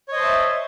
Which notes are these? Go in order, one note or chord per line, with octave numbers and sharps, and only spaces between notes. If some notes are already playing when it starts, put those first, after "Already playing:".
C5 C#5 D#5 E5 A5